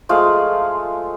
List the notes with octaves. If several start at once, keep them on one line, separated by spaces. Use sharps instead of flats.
F3 G#3 A3 F5